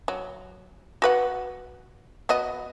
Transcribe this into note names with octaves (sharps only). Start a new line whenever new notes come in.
F#3
F#4 B4 F#5
B3 F#4 D#5